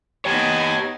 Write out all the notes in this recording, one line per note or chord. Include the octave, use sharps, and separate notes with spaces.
B3 D#4 G4 C#5 G#5 A5